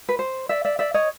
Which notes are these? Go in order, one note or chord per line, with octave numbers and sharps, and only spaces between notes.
B4
C5
D5 E5
D5 E5
D5 E5
C#5 D#5